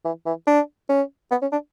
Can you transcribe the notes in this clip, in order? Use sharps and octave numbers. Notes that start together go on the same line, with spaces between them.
E3
E3
D4
C#4
B3
C#4
D4